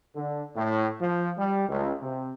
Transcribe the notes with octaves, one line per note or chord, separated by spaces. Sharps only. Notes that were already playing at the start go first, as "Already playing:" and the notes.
D3
A2
F3
G3
C#2
C3